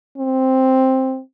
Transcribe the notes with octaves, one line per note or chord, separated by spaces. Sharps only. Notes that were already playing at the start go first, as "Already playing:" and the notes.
C4